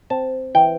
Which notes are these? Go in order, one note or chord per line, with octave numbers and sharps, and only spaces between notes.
C4 A5
E3 G5